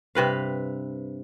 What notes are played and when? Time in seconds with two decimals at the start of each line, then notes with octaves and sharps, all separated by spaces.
0.15 G2 C3 B4 F5